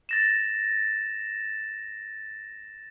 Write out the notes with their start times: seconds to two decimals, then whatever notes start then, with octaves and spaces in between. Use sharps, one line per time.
0.09 A6 A#6 E7